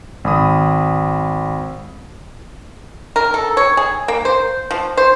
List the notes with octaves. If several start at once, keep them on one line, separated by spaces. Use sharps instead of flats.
G#1 B5 D#6
A#4
A4
C#5
G#4
A#3
C5
F3
C5